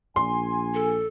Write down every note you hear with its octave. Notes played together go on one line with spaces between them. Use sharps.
A#1 G#5 C6
A4